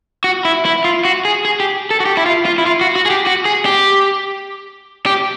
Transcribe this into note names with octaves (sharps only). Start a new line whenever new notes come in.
F#4
E4
E4
F4
F#4
G#4
G#4
G4
A4
F#4
G4
E4
F4
F4
E4
F4
F#4
F#4
G#4
G4
F#4
G#4
G4
G4